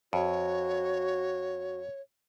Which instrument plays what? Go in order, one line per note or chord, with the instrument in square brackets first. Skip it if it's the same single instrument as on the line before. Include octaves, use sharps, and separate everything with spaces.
[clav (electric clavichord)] F2 [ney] F#4 [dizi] C#5